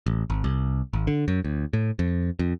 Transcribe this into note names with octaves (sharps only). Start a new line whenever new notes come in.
A1
G#1
C2
G#1
D3
F#2
D2
A2
F2
F2